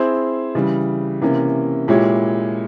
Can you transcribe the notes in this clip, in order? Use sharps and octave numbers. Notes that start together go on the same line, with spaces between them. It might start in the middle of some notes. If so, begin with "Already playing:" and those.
Already playing: C4 E4 G#4 C5
C#3 E3 G3
C3 E3 A#3 C#4
A#2 G#3 E4 G4 C#5